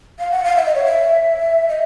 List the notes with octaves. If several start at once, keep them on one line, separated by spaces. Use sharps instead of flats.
F5
F#5
F5
E5
D#5
C#5
E5
D#5